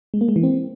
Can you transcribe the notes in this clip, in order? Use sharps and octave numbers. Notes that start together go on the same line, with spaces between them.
G#3
A#3
G#3
E3
C4